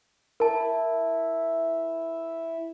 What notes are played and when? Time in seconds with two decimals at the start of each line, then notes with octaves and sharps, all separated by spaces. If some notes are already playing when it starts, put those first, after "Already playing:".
0.40 E4 A#4 A5